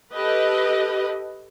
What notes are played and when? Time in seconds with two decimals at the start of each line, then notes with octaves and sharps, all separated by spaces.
0.13 G4 A4 B4 D#5